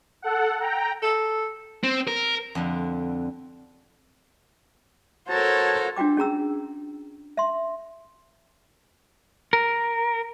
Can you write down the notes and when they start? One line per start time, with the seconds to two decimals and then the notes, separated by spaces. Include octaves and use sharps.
0.22 A4 F#5
0.60 G5 A#5
1.03 A4
1.84 C4
2.08 A#4
2.55 F2 D3
5.29 F#4 A4 A#4 C5 C#5 A5
5.96 D4 F4 F#4 G5 D6
6.17 C#4 G#4 A#5 E6
7.37 E5 C6
9.53 A#4